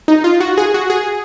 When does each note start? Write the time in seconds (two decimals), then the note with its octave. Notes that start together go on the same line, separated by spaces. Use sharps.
0.08 D#4
0.24 F4
0.40 F#4
0.58 G#4
0.74 F#4
0.90 G#4